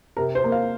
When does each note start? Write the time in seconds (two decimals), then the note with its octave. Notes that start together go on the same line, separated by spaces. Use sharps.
0.17 C3 A#4
0.35 C5
0.44 A#3
0.52 F5